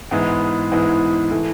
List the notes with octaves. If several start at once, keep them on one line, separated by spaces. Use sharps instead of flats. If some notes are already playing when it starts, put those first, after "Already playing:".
G#2 E3 G#3 B3 E4
G#2 E3 G#3 B3 E4
E3 A3